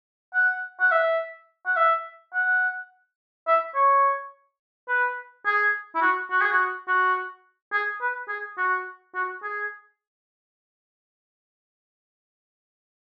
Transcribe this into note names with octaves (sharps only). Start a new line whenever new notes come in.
F#5
F#5
E5
F#5
E5
F#5
E5
C#5
B4
G#4
E4
F#4
F#4
G#4
F#4
F#4
G#4
B4
G#4
F#4
F#4
G#4